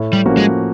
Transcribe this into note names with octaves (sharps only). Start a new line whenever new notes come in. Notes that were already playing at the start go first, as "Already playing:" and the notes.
Already playing: A2
G3
F3 A#3 C#4 F#4
G#3